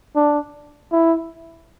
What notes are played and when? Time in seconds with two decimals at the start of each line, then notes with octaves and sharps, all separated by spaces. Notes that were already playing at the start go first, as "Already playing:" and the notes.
0.16 D4
0.92 E4